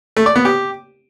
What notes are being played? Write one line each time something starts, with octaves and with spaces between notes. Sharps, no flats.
A3
D5
B3
G4